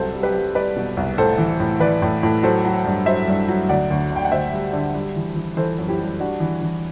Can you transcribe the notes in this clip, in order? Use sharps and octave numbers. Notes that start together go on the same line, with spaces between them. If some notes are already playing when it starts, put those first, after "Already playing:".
Already playing: C2 C3 F#3 A4 C5
G3
G4 B4
G3
G3 B4 D5
B2
C2
A2 A4 C5
E3
A2
E3 B4 D5
A2
A2
F#3 A4 C5
F#3
G2
F#3 C5 E5
G2
F#3
D2 D5 F#5
D2
D3
G5
F#5
D2 C5 E5
G3
D3
G3
E3
E3
E3 A4 C5
F#2
E4 G4
G3
G3 D4 F#4
E3
E3